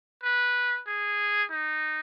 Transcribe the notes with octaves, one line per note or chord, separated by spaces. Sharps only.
B4
G#4
D#4